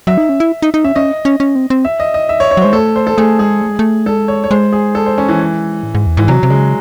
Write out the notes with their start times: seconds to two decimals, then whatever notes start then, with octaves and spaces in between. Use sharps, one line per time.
0.07 F#3 E5
0.18 D#4
0.29 C#4
0.40 E4
0.62 D#4
0.74 D#4
0.84 C#4 E5
0.95 C#4 D#5
1.25 C#4
1.40 C#4
1.56 C4
1.70 C4
1.85 E5
2.00 D#5
2.14 D#5
2.29 E5
2.40 C#5
2.51 C#5
2.57 F#3
2.62 G#3 C5
2.73 A3 A4
2.96 C5
3.07 A4
3.17 A3 G#4
3.39 G#3 G#4
3.62 A3
3.70 G#3
3.79 A3
4.06 G#3 A4
4.28 C#5
4.44 C#5
4.51 G#3 C5
4.73 G#4
4.95 A4
5.06 C5
5.18 C#4
5.29 E3
5.83 A2
5.95 G#2
6.07 E2
6.17 G#2 E3
6.28 C3 F#3
6.43 C3
6.50 C#3 G#3